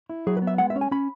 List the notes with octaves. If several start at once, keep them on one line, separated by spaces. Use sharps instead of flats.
E4
F#3 G#4
B4
B3
E5
G#3 F#5
E5
C#4
G#5
C#4 B5